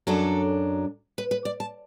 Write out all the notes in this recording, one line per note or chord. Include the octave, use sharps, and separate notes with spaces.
F#2 F#3 D4 A4
B4
B4
D5
A5